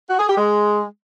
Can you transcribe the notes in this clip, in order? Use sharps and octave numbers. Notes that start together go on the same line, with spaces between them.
F#4
G#4
G4
G#3